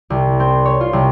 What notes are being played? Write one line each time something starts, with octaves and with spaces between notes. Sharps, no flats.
C2
C4
C#5
F4
C2